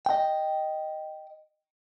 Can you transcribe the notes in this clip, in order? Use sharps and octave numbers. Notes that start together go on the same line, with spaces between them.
D#5 G5